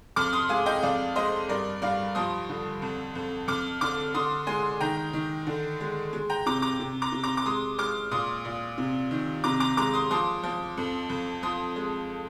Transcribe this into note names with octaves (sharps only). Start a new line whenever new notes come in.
F2 D6 F6
C6 D#6
G#3 F5 G#5
D#5 G5
F2 D5 F5
G#3 C5 D#5
G2 A#4 D5
G2 D5 F5
F3 C6 D#6
D3
F2
F2
F2 D6 F6
D3 D6 F6
D3 C6 D#6
G#3 G#5 C6
D#3 G5 A#5
D#3
D3
G#3
G#3
G5 A#5
C3 A#5 D6
A#5 D6
C3
A#5 D6
C3
A#5 D6
D6
G#3 C6 D#6
G#3 D6 F6
A#2 C6 D#6
A#2
C3
D#3
C3 A#5 D6
A#5 D6
G#3 A#5 D6
C6 D#6
F3 C6 D#6
F3
F2
F2
F3 C6 D#6
G#3